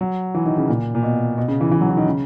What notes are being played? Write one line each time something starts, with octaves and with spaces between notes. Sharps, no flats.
F#3
E3
D#3
C#3
A#2
A#2
B2
B2
C#3
E3
E3
F#3
E3
D#3
C#3